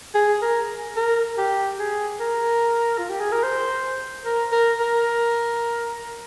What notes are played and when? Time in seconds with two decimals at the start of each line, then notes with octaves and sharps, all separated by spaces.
0.15 G#4
0.42 A#4
0.96 A#4
1.38 G4
1.79 G#4
2.20 A#4
2.98 F4
3.09 G4
3.20 G#4
3.32 A#4
3.43 C5
4.25 A#4
4.52 A#4
4.80 A#4